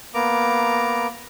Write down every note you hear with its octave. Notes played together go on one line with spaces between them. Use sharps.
A#3 B3 A#5 D6